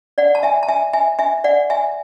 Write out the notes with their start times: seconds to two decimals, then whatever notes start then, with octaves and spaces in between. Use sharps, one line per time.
0.18 D5 F#5
0.35 A5
0.43 E5 G#5
0.63 A5
0.68 E5 G#5
0.93 E5 G#5
1.19 E5 G#5
1.44 D5 F#5
1.70 E5 G#5